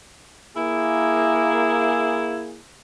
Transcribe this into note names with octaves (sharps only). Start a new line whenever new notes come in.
A#3 E4 G#4